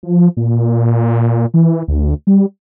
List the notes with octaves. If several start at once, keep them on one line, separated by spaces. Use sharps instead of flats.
F3
A#2
E3
D2
G3